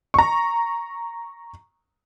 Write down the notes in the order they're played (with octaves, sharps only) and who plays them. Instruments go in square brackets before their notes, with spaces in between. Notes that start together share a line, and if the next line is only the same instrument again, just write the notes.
[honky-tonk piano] A#5 C#6